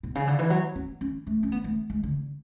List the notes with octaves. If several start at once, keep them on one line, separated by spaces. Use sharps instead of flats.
B2
C#3
D3
E3
F#3
C#4
C#4
A3
C#4
B3
A3
G#3
D3